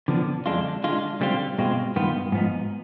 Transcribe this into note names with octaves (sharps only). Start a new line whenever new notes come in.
D3 F3 B3 D4
F2 D3 G#3 D4 F4
D3 G#3 D4 F4
D3 G3 C4 F4
B2 G#3 C4 F4
G2 D#3 B3 F4
G#2 F3 B3 D#4